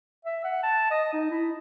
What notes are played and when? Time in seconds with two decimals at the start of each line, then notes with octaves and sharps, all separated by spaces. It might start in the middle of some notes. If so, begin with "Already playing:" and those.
0.25 E5
0.44 F#5
0.63 A5
0.91 D#5
1.13 D#4
1.31 E4